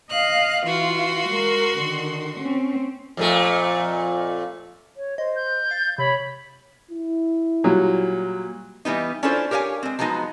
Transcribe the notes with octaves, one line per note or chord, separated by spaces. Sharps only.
D#5 F5 F#6
E3 F4 F#4 C6
G#3 A#4
D3 D#3
C4 C#4
F2 A#2 A3
C#5
C5 D#5
G6
F5 A6
C3 C#5 B5
E4
A#2 F#3 G3
E3 G3 B3 D#4
C#4 D4 E4 F4 A4 C5
G4 A#4 C#5 F5 G#5
G#3 C4
F3 F#3 G#3 B3 D#4